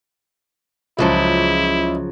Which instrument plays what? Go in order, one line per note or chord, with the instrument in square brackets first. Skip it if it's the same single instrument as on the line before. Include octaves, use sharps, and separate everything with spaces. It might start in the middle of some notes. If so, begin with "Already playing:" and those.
[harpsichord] C#2 [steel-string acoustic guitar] C#3 F3 F#3 [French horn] E4